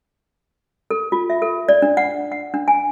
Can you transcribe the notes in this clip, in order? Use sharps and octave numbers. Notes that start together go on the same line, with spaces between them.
A4
F4
E5
A4
D5
D4
F#5
F#5
D4
G#5